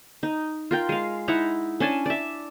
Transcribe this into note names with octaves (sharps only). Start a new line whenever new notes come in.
D#4
F4 A#4 G5
G#3 F5
D#4 E4 F#5 A#5
C#4 D4 G#5 A5
D5 E5